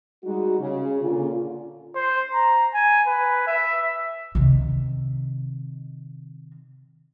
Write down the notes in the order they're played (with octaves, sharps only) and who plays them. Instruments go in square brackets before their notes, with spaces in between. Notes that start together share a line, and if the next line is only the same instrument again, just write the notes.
[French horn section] G3 G#3 D#4 F#4
C#3
A#2 D3 C#4 F4
[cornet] C5
A#5
G#5
B4
E5
[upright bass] C3 D#3